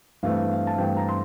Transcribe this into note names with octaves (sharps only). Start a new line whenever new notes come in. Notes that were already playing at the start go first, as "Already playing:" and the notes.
G2 E3 A3 C4 F5
F5
A5
G2 E3 A3 C4 G5
A#5
C6